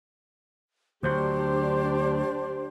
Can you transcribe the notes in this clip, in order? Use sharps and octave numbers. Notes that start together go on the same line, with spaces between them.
D2 F#3 D4 G4 C5